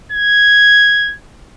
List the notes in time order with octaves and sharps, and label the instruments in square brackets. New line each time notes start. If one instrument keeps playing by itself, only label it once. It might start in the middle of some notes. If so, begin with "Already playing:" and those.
[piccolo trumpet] G#6